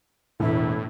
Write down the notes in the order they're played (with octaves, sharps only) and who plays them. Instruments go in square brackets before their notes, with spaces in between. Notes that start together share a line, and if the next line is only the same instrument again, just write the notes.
[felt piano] E1 [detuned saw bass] A2 [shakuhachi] E4